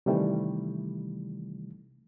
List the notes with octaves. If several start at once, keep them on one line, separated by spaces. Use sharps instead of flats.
C3 D#3 E3 G3 A3